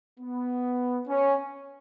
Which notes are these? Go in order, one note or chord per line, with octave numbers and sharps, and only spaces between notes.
B3
C#4